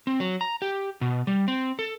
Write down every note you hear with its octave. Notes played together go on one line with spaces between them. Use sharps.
C4
F#3
A#5
G4
B2
G3
C4
A4